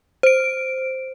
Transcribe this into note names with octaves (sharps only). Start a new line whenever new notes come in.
C5 D7